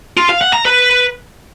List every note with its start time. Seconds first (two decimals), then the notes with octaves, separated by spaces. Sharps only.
0.17 F4
0.29 F5
0.41 F#5
0.53 A#5
0.65 B4